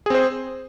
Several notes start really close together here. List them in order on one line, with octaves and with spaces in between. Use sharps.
G#4 C4 C5